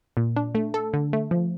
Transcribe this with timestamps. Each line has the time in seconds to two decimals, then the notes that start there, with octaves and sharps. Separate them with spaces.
0.17 A#2
0.36 D4
0.55 A3
0.74 A4
0.93 D3
1.13 A3
1.31 F3